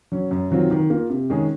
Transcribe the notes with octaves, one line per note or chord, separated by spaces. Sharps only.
F#3 C#4
F#2
D#3 F#3 C4 F4
D#3
A#3 F4
C3
D#3 G#3 C#4 G#4